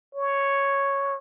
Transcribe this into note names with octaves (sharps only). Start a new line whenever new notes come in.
C#5